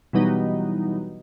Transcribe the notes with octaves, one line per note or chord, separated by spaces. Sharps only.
B2 E3 F#3 G3 B3 D#4